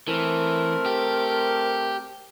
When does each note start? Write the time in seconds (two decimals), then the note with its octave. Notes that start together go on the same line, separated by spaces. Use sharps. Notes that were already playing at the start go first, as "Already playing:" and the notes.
0.08 E3 A3 C4 A#4
0.86 G4